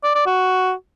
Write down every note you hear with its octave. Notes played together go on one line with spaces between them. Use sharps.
D5
D5
F#4